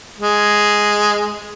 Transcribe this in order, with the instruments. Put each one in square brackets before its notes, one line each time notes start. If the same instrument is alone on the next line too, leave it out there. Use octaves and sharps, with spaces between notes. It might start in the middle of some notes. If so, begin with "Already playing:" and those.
[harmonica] G#3